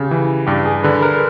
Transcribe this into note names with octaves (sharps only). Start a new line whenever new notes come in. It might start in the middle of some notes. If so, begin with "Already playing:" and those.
Already playing: C#3 G4
E3
G2 G4
G#4
D3 B4
A#4